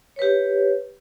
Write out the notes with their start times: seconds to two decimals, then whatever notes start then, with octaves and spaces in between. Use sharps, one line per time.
0.16 C#5
0.19 B4
0.22 G4